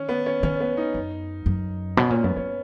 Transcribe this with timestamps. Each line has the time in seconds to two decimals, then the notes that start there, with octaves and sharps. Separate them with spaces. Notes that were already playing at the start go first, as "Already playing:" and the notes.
Already playing: D#3 C#4
0.09 B3
0.26 C#4
0.43 D#3 C#4
0.60 B3
0.77 D#4
0.94 F#2
1.46 F#2
1.97 B2 C#4
2.10 A#2 C#4
2.24 F#2 B3
2.36 F#2 C#4